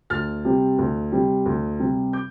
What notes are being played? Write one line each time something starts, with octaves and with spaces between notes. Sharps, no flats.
D2 F6 A6
C3 G3 C4
D2
C3 G3 C4
D2
C3 G3 C4
D6 G6